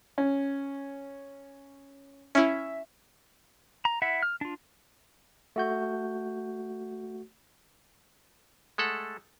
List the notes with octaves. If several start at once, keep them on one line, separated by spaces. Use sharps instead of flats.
C#4
C#4 E4 E5
A#5
E4 E5 F#5
F6
D4 F4
A3 F#4 G6
G#3 A3 A4 F#5